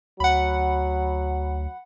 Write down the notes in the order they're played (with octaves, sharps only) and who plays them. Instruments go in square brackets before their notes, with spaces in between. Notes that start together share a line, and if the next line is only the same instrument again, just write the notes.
[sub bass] D2 [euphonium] F#3 [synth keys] F#5 B5